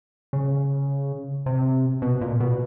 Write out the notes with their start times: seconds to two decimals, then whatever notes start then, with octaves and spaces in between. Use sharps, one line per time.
0.33 C#3
1.46 C3
2.02 B2
2.21 A#2
2.40 B2